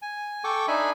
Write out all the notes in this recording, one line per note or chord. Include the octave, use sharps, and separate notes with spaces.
G#5
A4 G5 C#6 D6
D4 D#4 E5 G#5 B5